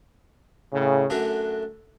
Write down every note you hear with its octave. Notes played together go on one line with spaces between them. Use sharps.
A2 C#3
F#2 D3 A3 D4 F#4